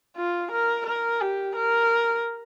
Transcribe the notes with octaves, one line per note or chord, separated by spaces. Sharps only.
F4
A#4
A#4
G4
A#4